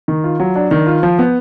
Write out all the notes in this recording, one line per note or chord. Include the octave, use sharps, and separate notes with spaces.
D#3
F4
F#3
D4
D#3
F4
F3
B3